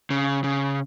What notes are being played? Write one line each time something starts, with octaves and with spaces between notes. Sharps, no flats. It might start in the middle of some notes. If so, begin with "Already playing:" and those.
C#3
C#3